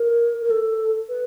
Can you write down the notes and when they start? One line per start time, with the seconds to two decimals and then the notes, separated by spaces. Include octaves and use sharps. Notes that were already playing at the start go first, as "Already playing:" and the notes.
Already playing: A#4
0.41 A#4
0.50 A4
1.09 B4